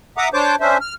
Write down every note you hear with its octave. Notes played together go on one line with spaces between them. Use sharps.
E5 F#5 A#5 D6 D#6
D4 C5 C#5 A5 D6 G6
C#4 D4 C5 E5
F6